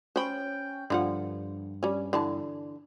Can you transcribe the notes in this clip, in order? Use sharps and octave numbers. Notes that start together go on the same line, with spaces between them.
C#4 C5 G5 B5
G2 D3 F3 F#5
G3 C#4
D3 E3 A5